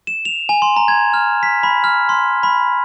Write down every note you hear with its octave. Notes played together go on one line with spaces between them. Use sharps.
E7
F7
G#5
C6
A#5
G#6
F6
B6
B5
F6
C6
B5